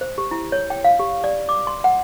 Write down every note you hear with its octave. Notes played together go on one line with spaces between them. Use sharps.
C5
G4
E4
C#5
G5
F5
G4
D5
D6
C6
F#5